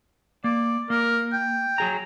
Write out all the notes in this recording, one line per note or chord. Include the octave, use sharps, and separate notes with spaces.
A#3 D5
A#3 A#4
G5
F#3 G#4 A#5